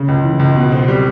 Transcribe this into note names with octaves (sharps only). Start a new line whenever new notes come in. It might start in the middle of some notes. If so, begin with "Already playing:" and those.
Already playing: C#3
C#2
E3
C#2
B2
C4
G3